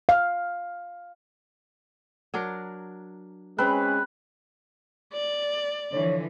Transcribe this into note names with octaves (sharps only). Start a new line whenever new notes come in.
F5
F#3 D4 A#4
G#3 C4 C#4 B4 B5
D5
D3 E3 F3 C#5